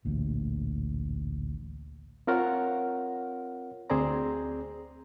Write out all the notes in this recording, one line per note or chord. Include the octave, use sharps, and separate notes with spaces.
A1 D2 A#2
C4 F4 A#4 C#5 F#5
D2 C4 G#4 C5 D5 A#5